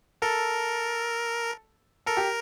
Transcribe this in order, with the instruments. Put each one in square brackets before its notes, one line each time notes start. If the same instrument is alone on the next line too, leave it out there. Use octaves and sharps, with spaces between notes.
[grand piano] A4 [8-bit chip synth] A#4
[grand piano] A4 [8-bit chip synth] A#4
[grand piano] G4